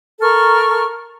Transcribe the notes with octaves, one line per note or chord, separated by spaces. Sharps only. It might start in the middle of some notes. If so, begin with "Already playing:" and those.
A4 A#4 C#6 F6